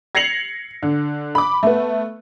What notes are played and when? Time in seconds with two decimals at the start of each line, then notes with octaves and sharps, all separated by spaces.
0.15 G#6 A#6 C7 C#7 F7 F#7
0.83 D3
1.35 B5 D6
1.63 A3 B3